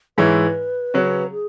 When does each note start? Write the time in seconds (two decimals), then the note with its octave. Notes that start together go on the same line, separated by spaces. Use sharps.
0.18 G#2 E3 G#3 E4 B4 C#5
0.94 C#3 F#3 C#4
1.32 G#4